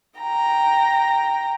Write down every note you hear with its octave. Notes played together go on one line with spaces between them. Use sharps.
G5 A#5